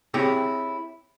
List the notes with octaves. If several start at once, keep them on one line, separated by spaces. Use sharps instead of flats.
C4 E4 G4 G#4 C#5 E5